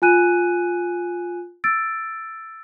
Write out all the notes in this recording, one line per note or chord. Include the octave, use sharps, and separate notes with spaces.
F4 G#5 F#6 D#7
E6 A6 D7